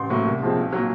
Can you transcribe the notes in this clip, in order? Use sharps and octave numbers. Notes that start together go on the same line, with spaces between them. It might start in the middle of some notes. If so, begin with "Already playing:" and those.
Already playing: A1 C6
A2 F#3 A#3
C2
A#2 F3 G#3 C4
B1
A#2 F#3